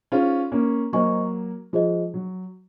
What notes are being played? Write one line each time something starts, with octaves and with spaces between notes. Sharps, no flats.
C#4 D#4 F4 G#4 C5 F5
A#3 C#4
F#3 A#3 C5 D#5 G#5 C#6
F3 G#3 F4 G#4 C5 D#5
F#3